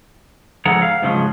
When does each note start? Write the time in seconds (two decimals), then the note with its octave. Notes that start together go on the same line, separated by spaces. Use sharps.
0.65 G#2 D3 F3 G#4 F#5 A#5
0.82 F5
1.02 G#2 C#3 F3 F#3 G#3